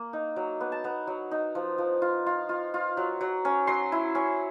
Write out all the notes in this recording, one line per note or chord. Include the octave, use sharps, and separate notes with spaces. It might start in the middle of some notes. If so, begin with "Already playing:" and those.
Already playing: A#3
D#4
F#3
B3
A5
B3 A#5
F#3
D#4
F3
F3
F4
F4
F4
F4
F#3
F#3
C#4
F#3 C6
E4
C#4